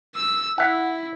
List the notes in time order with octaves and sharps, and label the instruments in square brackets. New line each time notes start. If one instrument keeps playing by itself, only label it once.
[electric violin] E6
[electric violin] E4 [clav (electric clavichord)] E5 F#5